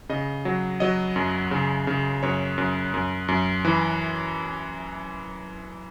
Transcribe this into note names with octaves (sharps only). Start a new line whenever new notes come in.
C#3 D#5
F#3
F#3 D#5
F#2
C#3
C#3
F#2 C#5
F#2
F#2
F#2
E3 B4